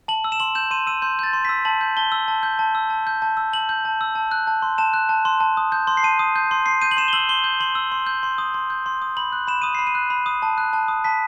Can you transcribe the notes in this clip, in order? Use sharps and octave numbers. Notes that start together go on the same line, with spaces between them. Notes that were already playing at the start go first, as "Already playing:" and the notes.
A5 F#7
E6
E7
C6 F#7
G6 E7
C6 D#7
E6 D#7
C6 G6
G6 A6
C6
E6 B6
A5 F#7
G6
A5 G7
E6
A5
G6
A5
E6
A5
G6
A5
E6
A5 F#7
G6
A5
E6
A5
F#6
A5
C6
A5 E7
F#6
A5
C6
A5
D#6
G6
C6
C7
A5 D#7
D#6
G6
C6
C6 C7
G6 D#7
F#7
C6 E7
G7
E6 F#7
C6 G7
G6
C6 F#7
E6
C6
G6
C6
D#6
C6
G6
C6
D#6
B5 F#7
F#6
B5 E7
D#6 D#7
B5 C7
D#7
F#6
B5
D#6
A5
F#6
A5
D#6
A5 B6